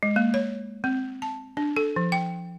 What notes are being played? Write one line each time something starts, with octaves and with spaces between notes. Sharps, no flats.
G#3
A#3
C#5
C4
A5
D4
A4
F3
G5